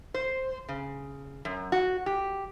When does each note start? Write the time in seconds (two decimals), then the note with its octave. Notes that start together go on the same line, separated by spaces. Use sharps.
0.14 C5
0.69 C#3
1.45 F#2
1.72 F#4
2.06 G4